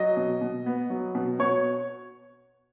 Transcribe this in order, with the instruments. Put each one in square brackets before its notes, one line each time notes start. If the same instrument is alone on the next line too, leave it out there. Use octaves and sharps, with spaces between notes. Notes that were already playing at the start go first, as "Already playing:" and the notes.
Already playing: [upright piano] F#3 D#5
B2
B2
B3
F#3
B2
B2 C#5